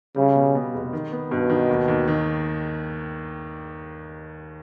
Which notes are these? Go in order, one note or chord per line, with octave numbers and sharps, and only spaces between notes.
C#3 G3
B2
B2
F1
D#3
B3
G2 B2
D#3
D#2
D#2
D#3